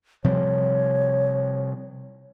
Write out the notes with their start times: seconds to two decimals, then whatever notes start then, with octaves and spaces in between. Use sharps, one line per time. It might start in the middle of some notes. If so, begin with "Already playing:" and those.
0.24 C3 F3 G3 C#5